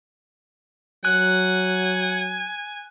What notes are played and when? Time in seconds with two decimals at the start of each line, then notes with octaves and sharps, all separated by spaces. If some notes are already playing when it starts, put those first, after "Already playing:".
1.05 F#3 F#5 G#5 F#6